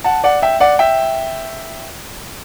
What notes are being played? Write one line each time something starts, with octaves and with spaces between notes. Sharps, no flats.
F#5 A5
D5 F#5
E5 G5
D5 F#5
E5 G5